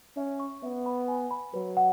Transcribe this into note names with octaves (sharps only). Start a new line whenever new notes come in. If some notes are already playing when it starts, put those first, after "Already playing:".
C#4 E5
C#6
B3 E5
B5
G#5
B5
F#3 B4
F#5